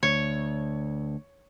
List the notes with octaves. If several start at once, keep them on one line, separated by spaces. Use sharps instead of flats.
D2 C#5